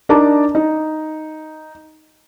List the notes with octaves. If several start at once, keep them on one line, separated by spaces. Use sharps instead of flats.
D4 D#4 A#4 A5 A#5 D6
D#4